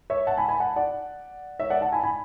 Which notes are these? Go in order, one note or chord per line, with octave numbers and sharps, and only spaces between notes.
C#5 E5
F#5 A5
G#5 B5
G#5 B5
F#5 A5
D5 F#5
C#5 E5
D5 F#5
F#5 A5
G#5 B5
G#5 B5